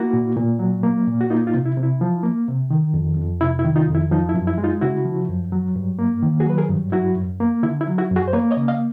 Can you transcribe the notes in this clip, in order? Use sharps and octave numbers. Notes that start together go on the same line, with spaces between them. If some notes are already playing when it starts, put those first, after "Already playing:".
Already playing: A#3 E4 F#4
A#2
A#2
F#3
A#3
A#2
F#4
A#3 D#4 F4
D#4 F4
C3
E4
C3
E4
F3
A#3
C3
D#3
F2
F2
C3 E4
E4
D#3
D#4 F4
F2
E4
F3 D#4
E4
F#2
E4
G#3
D#4 F4
C#3 E4 F#4
F3
F#2
F#3
G2
A#3
D#3
F#4 G#4
F#3 B4
G#4 A#4
G2
F#3 E4 F#4
F#2
A#3
D3 E4
E4
F#3
E4 F#4
F#2
F#4 G#4
C5
A#3 B4 C#5
C#5 D#5
C#3
D#5 F5